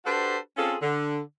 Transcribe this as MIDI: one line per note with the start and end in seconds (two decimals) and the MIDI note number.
0.05 0.37 62
0.05 0.37 66
0.05 0.37 67
0.05 0.37 69
0.05 0.37 71
0.05 0.37 72
0.57 0.75 60
0.57 0.75 61
0.57 0.75 65
0.57 0.75 68
0.57 0.75 69
0.81 1.19 50